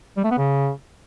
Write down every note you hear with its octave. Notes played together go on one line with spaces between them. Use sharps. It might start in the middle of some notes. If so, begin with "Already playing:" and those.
G3
A3
B3
C#3